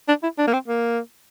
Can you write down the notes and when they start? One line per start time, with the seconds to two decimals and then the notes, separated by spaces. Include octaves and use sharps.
0.08 D4
0.23 E4
0.38 D4
0.47 A#3
0.53 C4
0.68 A#3